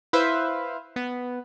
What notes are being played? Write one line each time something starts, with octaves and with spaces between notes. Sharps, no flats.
E4 B4 C5 E5 F5
B3